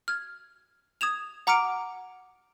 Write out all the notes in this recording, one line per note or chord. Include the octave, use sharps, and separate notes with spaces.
F6 G#6
D#6 G#6 E7 F7
F#5 A#5 D6 F6 C#7 D7